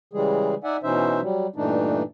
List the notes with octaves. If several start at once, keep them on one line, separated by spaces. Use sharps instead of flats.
C#3 E3 G3 G#3 G#4
D#4 D5 E5 F#5 G#5
B2 E3 C#4 D#4 C5 E5
F#3 G3
G2 A#2 E3 A3 D4 D#4